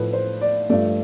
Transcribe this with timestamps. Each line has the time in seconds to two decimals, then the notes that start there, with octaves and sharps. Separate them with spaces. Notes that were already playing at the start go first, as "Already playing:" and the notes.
Already playing: A2 F3 A3 B4
0.13 C5
0.41 D5
0.70 G2 F3 A3 D5